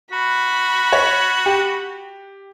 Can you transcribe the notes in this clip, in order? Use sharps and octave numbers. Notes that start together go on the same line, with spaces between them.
F#4 B5
C#5
G4